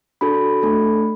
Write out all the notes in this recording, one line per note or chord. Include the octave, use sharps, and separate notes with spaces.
D4 F#4 A4 B5
A3 D4 A4